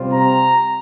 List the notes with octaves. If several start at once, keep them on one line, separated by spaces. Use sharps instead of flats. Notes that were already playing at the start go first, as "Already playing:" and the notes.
Already playing: C3 G3 C4 F4
A#5